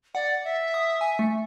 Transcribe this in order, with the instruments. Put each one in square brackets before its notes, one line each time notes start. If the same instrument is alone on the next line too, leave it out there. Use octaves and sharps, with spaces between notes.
[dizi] D5 [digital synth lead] F#5
[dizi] E5
[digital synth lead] D#6
G#5
A3